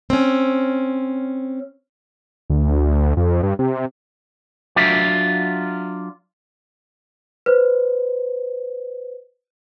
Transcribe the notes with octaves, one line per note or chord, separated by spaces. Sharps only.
C4 C#4
D2
F2
G2
C3
F#3 D4 F4 E5
B4 C5